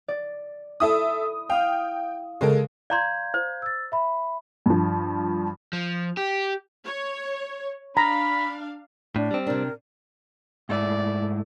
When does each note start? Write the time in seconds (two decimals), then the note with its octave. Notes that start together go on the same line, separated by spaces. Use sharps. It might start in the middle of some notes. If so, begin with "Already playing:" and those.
0.08 D5
0.80 E4 A4 E5 D#6
1.50 F5 G5 D#6 F6
2.41 C#3 G#3 A4 A#4
2.90 D5 F5 A#5 C6 G6 G#6
3.34 C5
3.62 E6 A6
3.92 E5 B5
4.66 G2 F3
5.73 F3
6.17 G4
6.84 C#5
7.97 D4 F5 A#5 B5
9.16 A2 D4
9.31 G3 C4
9.47 C3 D4 A#4
10.69 G#2 A3 E4 D5